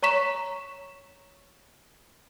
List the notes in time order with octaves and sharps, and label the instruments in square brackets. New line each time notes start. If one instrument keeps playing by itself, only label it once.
[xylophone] C#5 A#5 C#6 B6 E7